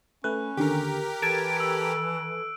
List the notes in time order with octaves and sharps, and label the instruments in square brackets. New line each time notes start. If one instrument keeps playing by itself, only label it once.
[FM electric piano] A3 B4 [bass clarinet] C#4 [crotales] F#6
[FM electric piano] D#2 D3 [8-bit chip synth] G4 A#4
[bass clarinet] E3 [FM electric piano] A4 A5 G#6 [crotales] D7
[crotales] E6 D7